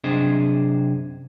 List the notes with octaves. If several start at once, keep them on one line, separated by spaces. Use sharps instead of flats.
F#2 C3 D4 G#4 C5 D#5